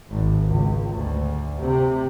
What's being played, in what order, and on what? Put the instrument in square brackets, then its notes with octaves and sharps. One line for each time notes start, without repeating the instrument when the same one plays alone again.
[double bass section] G#1
C#2
D2
C3